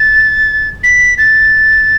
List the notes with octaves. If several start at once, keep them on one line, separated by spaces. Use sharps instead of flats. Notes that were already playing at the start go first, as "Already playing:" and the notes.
Already playing: A6
B6
A6